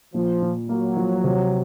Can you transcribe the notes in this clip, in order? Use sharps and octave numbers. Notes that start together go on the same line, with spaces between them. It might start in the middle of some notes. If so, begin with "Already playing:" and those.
A#2 F3
A#2
F#3 A#3
F3
C3